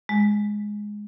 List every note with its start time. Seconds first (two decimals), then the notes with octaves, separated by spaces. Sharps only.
0.09 G#3